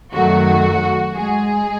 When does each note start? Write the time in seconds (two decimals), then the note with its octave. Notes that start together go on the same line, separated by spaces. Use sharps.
0.14 F#2 D#3 F#3 A3 F#4
1.16 G#3 G#4